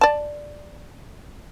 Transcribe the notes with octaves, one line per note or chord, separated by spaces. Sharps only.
D5 A5